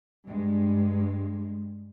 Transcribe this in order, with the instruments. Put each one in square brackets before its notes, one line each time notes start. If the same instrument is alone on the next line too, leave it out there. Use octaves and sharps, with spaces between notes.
[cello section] G2 G#3